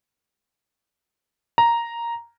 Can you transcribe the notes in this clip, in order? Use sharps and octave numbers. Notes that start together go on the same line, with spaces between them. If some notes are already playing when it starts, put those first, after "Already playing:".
A#5